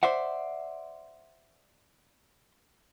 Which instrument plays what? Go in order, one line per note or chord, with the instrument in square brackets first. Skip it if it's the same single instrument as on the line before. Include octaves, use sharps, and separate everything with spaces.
[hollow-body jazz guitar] C5 D5 E5 F#5